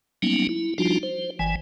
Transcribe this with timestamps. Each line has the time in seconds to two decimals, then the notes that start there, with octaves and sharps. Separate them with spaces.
0.22 F#3 G3 A#3 B3 C#4 D#4
0.49 E4
0.78 F3 G3 D4 D#4 F4 F#4
1.03 C5
1.39 G1 E3 G#5